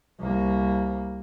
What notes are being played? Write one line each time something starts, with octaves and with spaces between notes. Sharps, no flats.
C2 A#3